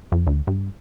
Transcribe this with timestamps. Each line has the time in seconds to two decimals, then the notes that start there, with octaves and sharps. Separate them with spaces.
0.12 F2
0.27 D2
0.47 G2